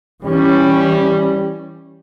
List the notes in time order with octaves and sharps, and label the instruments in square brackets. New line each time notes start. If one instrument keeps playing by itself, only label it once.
[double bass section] E3 C#4 [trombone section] G3